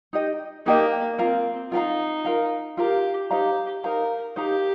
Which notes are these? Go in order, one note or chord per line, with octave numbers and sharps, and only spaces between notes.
D#4 G4 D#5
A#3 D#4 G4 D#5
C4 F4 A#4 F5 A#5
D#4 F4 A#4 F5 A#5
F4 A#4 F5 A#5
F4 G4 A#4 F5 A#5
D#4 G4 C5 F5 A#5
D#4 A#4 C5 F5 A#5
D#4 G4 C5 F5 A#5